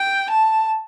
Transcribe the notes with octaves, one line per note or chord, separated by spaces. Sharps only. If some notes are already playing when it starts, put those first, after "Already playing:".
Already playing: G5
A5